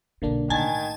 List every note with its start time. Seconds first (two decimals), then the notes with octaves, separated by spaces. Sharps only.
0.22 B1 B2 D3 A#3 D4
0.50 A2 D#3 G#5 A5